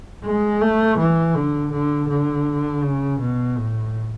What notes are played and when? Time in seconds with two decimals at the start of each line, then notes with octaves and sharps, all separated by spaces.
0.24 G#3
0.61 A3
0.98 E3
1.35 D3
1.72 D3
2.10 D3
2.83 C#3
3.20 B2
3.58 A2